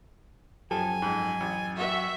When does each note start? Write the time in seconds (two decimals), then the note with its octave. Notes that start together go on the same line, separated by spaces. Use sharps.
0.71 F#2 F3 G4 A4 G#5
1.02 F2 G#2
1.40 A1
1.78 F#4 E5